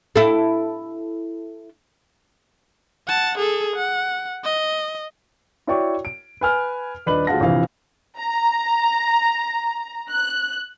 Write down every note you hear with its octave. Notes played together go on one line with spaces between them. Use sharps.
E4 A4
F#5 A5
G#4 A4
F#5
D#5
E4 F#4 C#5 D5 G5 C#6
D7
B4 G#5 F6
D#1 D4 B4 D#5 B5 F#7
D2 F4 G#4 F#5 A5 A#6
A#1 C3 E3 F5
A#5
F#6